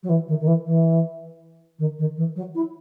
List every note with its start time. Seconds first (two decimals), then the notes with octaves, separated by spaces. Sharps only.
0.03 F#3
0.09 E3
0.28 D#3
0.40 D#3
0.47 E3
0.65 E3
1.79 D#3
1.98 D#3
2.17 E3
2.36 F#3
2.55 E4